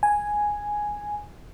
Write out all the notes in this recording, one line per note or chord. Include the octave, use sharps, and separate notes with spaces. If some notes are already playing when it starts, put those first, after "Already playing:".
G#5